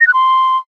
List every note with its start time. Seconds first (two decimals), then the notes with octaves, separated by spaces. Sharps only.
0.01 A#6
0.07 F#6
0.14 C6